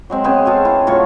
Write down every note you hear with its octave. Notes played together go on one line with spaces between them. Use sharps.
F#3 G#3 C4
C#3 B3 C4 G#4
F#4 G#4 A4 F5
E4
A2 F#3 F4 C#5